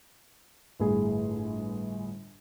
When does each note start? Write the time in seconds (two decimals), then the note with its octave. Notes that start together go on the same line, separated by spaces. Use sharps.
0.80 G1 A2 G#4